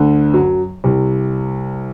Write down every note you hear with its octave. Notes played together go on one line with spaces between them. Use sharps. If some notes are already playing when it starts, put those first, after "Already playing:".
Already playing: D2 D3
F#2 F#3
C2 C3